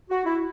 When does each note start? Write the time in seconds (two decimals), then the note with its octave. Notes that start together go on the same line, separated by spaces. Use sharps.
0.10 F#4
0.25 E4